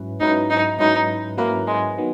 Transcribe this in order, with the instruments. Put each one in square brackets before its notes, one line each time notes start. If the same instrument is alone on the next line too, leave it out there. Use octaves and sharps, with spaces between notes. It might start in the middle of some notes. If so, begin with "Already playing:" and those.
Already playing: [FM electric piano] G#2 F#3 C#4 E4 B4
[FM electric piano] G#2 F#3 C#4 E4 B4 [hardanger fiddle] D#4
[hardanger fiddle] D#4
[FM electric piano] G#2 F#3 C#4 E4 B4 [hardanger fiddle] D#4
[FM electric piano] G#2 F#3 C#4 E4 B4 [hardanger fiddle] A#3
[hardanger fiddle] G#3
[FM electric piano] D#3 F#3 B3